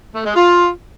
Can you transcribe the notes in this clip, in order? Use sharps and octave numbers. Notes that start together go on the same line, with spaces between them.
A3
G#3
F4